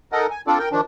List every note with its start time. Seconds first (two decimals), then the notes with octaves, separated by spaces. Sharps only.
0.12 D#4 A4 A#4 D#5 F#5
0.31 G#5
0.47 C4 D4 F4 A4 D5
0.59 A#4 G5
0.72 D#3 F3 D4